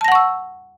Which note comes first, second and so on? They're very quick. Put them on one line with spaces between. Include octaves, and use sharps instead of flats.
A5 A#6 F#5 C#6 E6